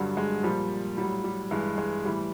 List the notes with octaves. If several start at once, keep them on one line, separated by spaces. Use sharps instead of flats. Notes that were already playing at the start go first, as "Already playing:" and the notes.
Already playing: G2 D3 F#3 G3
G#3
A#2 F3 G3
A2 F#3 G3
G3
G2 E3 G#3
G#3
A2 E3 G3